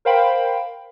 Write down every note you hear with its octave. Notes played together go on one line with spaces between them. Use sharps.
A#4 C5 F5 G5 B5